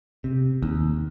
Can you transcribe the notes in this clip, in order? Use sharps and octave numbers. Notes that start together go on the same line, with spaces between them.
C3
D#2